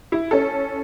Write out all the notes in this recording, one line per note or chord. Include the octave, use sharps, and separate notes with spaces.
E4
C#4 A4